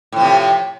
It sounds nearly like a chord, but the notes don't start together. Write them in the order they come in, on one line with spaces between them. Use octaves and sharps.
A2 F3 C3